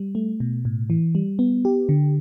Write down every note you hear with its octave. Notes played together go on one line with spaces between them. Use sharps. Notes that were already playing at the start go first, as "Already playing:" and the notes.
Already playing: G3
A3
B2
A2
E3
G3
B3
G4
D3